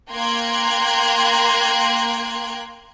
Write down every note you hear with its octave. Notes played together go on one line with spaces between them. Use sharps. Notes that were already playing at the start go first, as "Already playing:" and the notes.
A#3 G5 A#5 C6 F#6 G#6